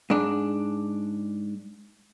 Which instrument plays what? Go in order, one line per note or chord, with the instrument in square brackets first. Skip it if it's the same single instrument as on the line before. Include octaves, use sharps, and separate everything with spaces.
[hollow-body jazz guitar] G#2 D4